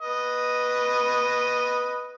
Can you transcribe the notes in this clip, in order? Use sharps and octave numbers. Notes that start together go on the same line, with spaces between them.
B4 D#5